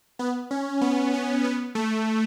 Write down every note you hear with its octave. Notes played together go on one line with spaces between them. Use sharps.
B3
C#4
B3
C#4
B3
A3